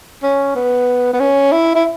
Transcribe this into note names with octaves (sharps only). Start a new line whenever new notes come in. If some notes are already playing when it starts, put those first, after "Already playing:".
C#4
B3
B3
C#4
E4
E4